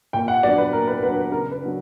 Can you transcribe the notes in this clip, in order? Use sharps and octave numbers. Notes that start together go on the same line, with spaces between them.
A#2 G5
F#5
F#3 B3 D4 D5
B4
A#2 A#4
B4
F#3 B3 D4 B4
B4
C#3 A#4
B4
F#3 B3 D4